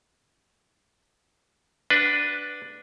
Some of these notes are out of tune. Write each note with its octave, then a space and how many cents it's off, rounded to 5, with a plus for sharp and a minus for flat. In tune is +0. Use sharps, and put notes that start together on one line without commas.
D4 +0 F#4 +0 B4 +0